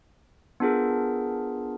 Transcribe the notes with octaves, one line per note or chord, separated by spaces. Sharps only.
B3 D4 F4 G#4 A#4